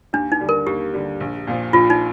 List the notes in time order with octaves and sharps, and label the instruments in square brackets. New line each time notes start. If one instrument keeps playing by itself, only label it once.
[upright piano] D#2 [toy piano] D4
[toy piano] D#4
[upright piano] D3 G3
[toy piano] A#4
[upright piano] D#2 [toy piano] G4
[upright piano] D3 G3
A#1
A#2 F3
[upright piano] A#1 [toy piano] F4
[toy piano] D#4